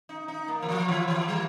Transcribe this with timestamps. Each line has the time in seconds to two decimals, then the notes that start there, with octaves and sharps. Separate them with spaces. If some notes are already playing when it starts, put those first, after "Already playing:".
0.09 D#4
0.28 D#4
0.48 A#3
0.63 E3
0.69 F3
0.88 E3
1.08 E3
1.28 G3